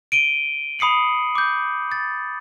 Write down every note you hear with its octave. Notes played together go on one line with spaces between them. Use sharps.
D7 D#7 G7
B5 D#6 C7 C#7 F#7
D6 G6
A6